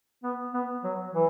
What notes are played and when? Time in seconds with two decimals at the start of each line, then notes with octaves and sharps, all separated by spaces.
0.23 B3
0.54 B3
0.84 F#3
1.14 E3